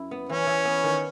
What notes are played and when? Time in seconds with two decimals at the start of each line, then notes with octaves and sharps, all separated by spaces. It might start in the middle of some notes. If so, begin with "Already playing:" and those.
Already playing: F#2 E4
0.11 B3
0.29 E3 C#4
0.47 E3
0.65 B3
0.84 D#3